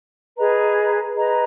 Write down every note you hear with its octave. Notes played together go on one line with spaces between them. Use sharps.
G#4 B4 D#5 A#5
G#4 B4 D#5 A#5